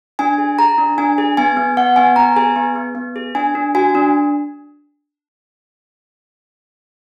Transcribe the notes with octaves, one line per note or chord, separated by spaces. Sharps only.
D4 G#5
G#4
G#4 A#5
D4
D4 G#5
G#4
B3 G#5
B3
B3 F#5
B3 G#5
B3 A#5
G#4 G#5
B3
B3
B3
G#4
D4 G#5
D4
F#4 G#5
D4